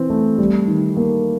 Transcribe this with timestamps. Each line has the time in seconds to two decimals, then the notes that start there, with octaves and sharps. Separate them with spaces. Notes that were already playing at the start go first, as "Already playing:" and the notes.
Already playing: E3 C4
0.10 A3
0.38 G3
0.68 D#3
0.97 A#3